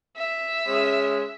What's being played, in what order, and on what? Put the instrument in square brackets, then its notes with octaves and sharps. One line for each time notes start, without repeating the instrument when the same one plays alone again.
[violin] E5
[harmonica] G#3 C#4